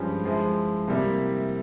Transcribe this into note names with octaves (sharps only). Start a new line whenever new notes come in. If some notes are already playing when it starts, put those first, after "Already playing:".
Already playing: G2 F3 G#3 C#4 G4
F3 G#3 E4
C3 G3 A#3 E4